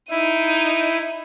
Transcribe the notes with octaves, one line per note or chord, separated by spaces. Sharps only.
D#4 E4 D#7